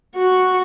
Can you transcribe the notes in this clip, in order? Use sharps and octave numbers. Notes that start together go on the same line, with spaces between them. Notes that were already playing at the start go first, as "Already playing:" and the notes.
F#4